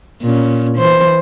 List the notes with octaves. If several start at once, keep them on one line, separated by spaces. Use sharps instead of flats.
A#2 C#4
E3 C5